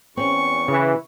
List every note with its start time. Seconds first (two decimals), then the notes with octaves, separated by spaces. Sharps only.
0.17 E2 C4 C#4 C#6
0.68 C#3 E3